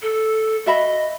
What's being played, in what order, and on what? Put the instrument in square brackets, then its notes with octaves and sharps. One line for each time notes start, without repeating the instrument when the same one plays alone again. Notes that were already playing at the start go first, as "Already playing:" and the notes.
[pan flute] A4
[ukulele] F#4 E5 B5 [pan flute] D#5